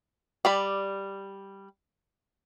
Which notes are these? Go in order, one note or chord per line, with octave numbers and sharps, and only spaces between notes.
G3 D5 B5